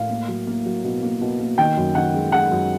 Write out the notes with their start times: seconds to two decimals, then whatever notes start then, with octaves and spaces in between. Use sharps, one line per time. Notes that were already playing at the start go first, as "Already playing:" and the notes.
Already playing: A2 F5
0.10 A#3
0.28 F#3
0.47 A#3
0.66 F#3
0.84 B2
1.03 A#3
1.21 B2
1.40 A#3
1.58 D#3 G5
1.77 F#2
1.95 D#3 F#5
2.14 G#3
2.32 G#3 F#5
2.51 F#2